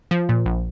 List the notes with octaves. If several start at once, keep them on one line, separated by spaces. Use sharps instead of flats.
F3
A#2
A#1